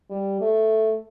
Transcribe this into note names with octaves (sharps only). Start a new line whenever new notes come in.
G3
A3